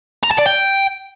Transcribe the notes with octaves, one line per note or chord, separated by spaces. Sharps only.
A#5
A5
D5
G5